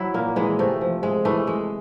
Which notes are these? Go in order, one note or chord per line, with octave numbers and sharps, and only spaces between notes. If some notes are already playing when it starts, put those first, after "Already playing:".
Already playing: F#3 E4
A#2 A#3
E3 G#3
C3 A3
F3
G#3
E3 A3
G#3